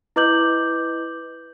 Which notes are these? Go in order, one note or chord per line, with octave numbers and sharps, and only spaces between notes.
E4 B4 D#5 D6 G6 F#7